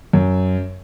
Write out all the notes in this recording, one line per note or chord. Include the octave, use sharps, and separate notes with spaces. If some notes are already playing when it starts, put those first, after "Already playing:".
F#2